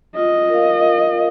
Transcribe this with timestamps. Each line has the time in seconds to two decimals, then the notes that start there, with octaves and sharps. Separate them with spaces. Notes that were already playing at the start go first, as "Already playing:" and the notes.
0.16 F4 D#5
0.50 A#4 F5
0.83 F4